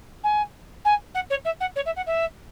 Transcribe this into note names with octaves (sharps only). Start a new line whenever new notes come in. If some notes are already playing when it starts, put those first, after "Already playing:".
G#5
G#5
F#5
C#5
E5
F#5
C#5
E5
F#5
E5